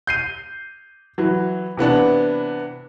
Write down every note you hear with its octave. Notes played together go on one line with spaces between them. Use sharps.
G6 C7 D#7
E3 F#3
C3 E3 B3 D4